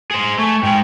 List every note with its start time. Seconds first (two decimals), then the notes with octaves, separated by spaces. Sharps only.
0.11 G#4 C5
0.38 A3 G#5 C#6
0.63 G#2 G#3 G5